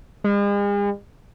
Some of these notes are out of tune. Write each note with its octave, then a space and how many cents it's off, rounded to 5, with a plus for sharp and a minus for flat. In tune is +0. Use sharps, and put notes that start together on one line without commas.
G#3 -45